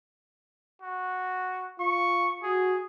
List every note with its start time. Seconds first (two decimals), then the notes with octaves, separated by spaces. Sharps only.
0.82 F#4
1.80 F4 C#6
2.43 F#4 G#4